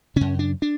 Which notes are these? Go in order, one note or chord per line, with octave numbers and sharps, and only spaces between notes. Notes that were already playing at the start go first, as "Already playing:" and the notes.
F#2 C#3 C#4
D4
D4